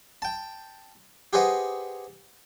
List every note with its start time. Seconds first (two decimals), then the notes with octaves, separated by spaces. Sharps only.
0.22 G5 A5
1.33 G4 G#4 B4 C5 D#5 F#5